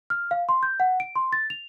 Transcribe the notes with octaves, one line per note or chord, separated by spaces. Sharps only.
F6
F5
C6
G6
F#5
D7
C6
A6
F7